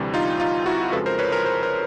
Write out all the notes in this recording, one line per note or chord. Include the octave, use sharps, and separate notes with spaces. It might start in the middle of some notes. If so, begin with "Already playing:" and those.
Already playing: D2 C3 E3 G3
D#4 F4
D#4 F4
E4 F#4
F2 C#3 F3 G#3 A4 B4
A#4 C5
B4 C#5
A#4 C5
A#4 C5
A#4 C5